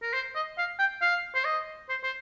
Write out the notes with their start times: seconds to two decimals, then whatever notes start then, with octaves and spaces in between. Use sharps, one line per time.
0.03 A#4
0.13 C5
0.36 D#5
0.58 F5
0.79 G5
1.02 F5
1.35 C5
1.45 D#5
1.89 C5
2.04 C5